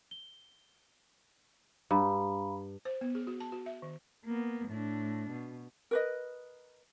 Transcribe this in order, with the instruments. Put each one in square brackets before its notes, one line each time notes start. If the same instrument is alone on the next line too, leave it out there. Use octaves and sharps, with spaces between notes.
[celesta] G7
[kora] G2 [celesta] F5 A#5 B5
[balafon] C5
B3
G#4
F#4
A5
F#4
E5
D#3
[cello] A#3 B3
A2 D4
B2
[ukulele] A#4 B4 D#5